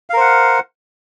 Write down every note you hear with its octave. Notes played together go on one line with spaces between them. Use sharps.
A#4 C5 F5 F#5